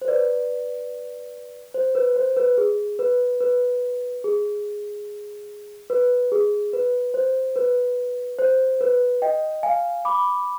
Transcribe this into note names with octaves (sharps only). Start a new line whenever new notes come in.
C5
B4 D5
C5
B4
C5
B4
G#4
B4
B4
G#4
B4
G#4
B4
C5
B4
C5
B4
D#5 G5
F5 G#5
B5 D6